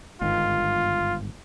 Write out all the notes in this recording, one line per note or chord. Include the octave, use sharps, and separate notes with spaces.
G1 G#2 D#3 F4